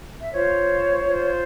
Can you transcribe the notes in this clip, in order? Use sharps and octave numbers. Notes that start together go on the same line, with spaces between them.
E5
F4 C5 C#5
F4 C5